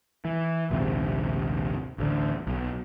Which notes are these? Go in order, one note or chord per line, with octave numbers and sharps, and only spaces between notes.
E3
A#1 D#2 G#2 C3
A1 D2 D3
B1